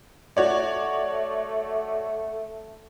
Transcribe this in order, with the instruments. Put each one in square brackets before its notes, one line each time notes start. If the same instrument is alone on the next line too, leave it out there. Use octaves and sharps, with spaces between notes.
[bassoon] A3 [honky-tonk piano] F#4 C#5 D5